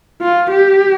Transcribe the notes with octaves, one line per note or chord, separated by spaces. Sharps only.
F4
G4